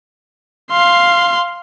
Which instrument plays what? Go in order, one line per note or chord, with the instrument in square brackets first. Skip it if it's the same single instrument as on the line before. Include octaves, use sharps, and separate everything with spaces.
[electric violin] F5 C6